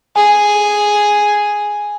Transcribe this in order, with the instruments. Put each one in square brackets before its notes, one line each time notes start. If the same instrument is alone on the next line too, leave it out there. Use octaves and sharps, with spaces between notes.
[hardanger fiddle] G#4 [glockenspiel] G#5